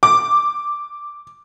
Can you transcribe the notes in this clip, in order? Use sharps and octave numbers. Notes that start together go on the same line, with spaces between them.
D6